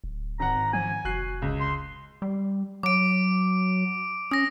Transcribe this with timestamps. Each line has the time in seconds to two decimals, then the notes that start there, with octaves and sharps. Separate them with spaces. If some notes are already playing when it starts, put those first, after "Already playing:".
0.04 D1
0.40 G#1 F#5 A#5
0.73 F3 G#5
1.05 F1 F#4 F#6 C7
1.42 C#2
1.60 C6
2.22 G3
2.83 F#3 D6 D7
4.31 C#4 D#6 A#6